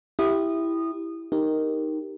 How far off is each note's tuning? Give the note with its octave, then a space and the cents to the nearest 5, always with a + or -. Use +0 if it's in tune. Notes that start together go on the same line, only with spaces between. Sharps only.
E4 +0 G4 +0 D#6 -20
D#4 +0 G4 +0 A#4 +0